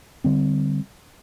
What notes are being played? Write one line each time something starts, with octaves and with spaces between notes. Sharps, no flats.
D3 G3 C4